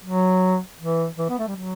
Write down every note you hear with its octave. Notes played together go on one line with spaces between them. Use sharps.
F#3
E3
E3
B3
A3
G3
F#3